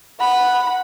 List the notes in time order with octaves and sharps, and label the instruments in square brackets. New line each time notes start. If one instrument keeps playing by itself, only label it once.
[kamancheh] F#5 B5